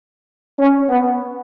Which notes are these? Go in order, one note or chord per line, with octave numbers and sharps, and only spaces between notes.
C#4
B3